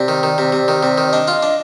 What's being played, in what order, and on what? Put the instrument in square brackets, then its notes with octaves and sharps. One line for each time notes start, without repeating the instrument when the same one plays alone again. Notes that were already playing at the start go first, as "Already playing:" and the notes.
Already playing: [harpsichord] C3 [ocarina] D5
[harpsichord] D#3
D#3
C3
C3
D#3
C3
D#3
[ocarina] D5
[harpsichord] D4 [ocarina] D#5
[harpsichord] F4
D4